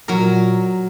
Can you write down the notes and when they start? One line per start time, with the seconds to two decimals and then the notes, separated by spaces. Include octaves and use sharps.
0.08 A#2 F#3 A#4